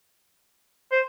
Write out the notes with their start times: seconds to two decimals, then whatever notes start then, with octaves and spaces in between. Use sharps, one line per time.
0.92 C5